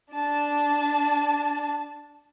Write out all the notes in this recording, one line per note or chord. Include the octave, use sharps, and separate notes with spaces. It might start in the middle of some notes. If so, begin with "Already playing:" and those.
D4 A5